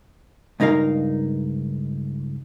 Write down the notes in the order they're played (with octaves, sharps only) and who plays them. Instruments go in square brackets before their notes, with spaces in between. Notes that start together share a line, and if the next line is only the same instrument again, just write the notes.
[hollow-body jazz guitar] C#2 G2 D#4 A#4 F5